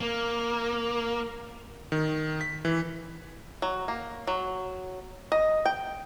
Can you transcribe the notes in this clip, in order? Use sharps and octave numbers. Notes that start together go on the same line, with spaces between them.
A#3
D#3
B6
E3
F#3
A#3
F#3
D#5
G5